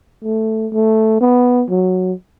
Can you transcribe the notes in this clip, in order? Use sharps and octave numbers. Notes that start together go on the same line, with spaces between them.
A3
A3
B3
F#3